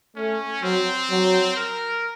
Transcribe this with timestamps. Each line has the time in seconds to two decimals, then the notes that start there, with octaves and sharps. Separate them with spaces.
0.16 A3 C#4
0.63 F#3 C4
1.11 F#3
1.57 A#4